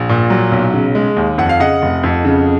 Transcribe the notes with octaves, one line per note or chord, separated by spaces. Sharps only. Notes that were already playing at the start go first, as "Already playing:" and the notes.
Already playing: A#1
A#2
F#3
B1
C#3
G#3
D#2
F2 F#5
F5
C#3 D#5 F#5
F1
F2
C#3